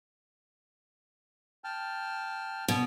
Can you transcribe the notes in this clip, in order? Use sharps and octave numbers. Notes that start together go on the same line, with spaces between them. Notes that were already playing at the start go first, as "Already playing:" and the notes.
G5 A5 F6
B2